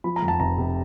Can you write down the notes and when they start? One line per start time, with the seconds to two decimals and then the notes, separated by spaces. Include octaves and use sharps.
0.04 F3 B5
0.16 A#5
0.22 F2
0.28 A5
0.40 F1 A#5
0.58 C3